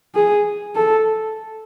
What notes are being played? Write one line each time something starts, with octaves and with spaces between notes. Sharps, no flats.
G#4
A4